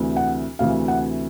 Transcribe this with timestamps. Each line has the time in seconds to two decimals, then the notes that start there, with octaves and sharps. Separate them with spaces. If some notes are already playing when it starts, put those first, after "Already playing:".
Already playing: D2 C3 E3
0.16 F#5
0.59 D2 C3 E3 F5
0.88 F#5